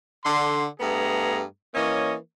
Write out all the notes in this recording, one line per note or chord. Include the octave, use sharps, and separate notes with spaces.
D3 C6
G2 A3 B3 G#4 A#5
E3 A#3 C#4 C#5 D#5